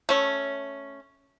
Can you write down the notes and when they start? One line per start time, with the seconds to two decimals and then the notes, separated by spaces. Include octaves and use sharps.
0.09 A3 C#4